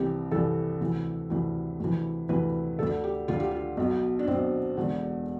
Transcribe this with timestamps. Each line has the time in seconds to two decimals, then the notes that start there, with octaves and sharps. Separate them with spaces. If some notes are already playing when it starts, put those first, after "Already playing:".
Already playing: C2 C3 E3 G4
0.31 C2 C3 E3 A4
0.81 D2 C3 E3
1.30 D2 C3 E3
1.80 D2 C3 E3
2.29 D2 C3 E3 B4
2.79 D2 D3 A4
3.04 G4
3.28 D2 D3 F4
3.40 G4
3.51 F4
3.77 B1 B2
4.19 D4
4.27 B1 B2 C4
4.77 E1 E2 D3